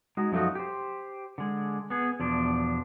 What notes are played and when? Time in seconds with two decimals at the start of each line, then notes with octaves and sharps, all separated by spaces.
0.17 G#3 D#4 F#4
0.32 F#2 F3 A3 D#4 F#4
0.55 G4 C5
1.38 D3 G#3
1.90 B3 G#4
2.20 E2 B2 F3 D4